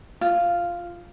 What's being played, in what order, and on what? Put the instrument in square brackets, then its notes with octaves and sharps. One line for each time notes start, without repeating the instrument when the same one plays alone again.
[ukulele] F4